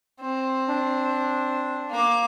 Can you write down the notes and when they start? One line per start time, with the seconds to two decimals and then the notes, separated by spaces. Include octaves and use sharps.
0.21 C4
0.68 D4
1.90 A#3 D6